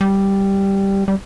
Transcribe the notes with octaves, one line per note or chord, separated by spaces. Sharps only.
G3
G3